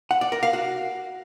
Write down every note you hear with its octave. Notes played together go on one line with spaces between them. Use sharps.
F#5
D5
A#4
F5
F#4